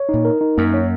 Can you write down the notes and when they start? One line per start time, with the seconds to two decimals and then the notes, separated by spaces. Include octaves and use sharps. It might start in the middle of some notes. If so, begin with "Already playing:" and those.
Already playing: C#5
0.09 D#4
0.14 A#2
0.25 A#4
0.41 D#4
0.57 F#2 A#3
0.74 C#5